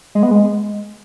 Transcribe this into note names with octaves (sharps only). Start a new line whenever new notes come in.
G#3
B3
G#3